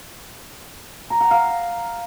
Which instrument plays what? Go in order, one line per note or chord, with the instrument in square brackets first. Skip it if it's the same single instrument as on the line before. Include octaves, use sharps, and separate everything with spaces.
[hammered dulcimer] A#5
F#5
F5